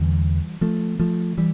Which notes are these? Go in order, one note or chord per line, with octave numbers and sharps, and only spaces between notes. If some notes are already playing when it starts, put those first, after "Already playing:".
Already playing: E2 D3 E3 G3
F3 A3
F3 A3
E3 G3